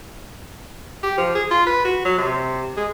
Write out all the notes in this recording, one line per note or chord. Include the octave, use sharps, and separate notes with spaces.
G4
F3
G#4
F4
B4
F#4
F#3
C3
G#3